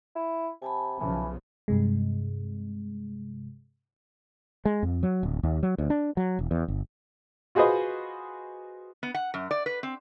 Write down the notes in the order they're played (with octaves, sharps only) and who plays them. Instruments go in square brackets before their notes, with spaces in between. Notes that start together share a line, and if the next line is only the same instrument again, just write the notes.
[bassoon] E4
[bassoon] C3 [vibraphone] G#5 A5 B5
[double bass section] B1 C#3 F3 [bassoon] E3
[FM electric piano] G2 C3 G#3
[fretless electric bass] G#3
F2
F#3
D1
D#2
F#3
D2
D4
F#3
E1
E2
G1
[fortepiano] F4 F#4 G#4 B4 C5 D#5
[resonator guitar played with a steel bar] B3
F#5
F#2
D5
B4
C4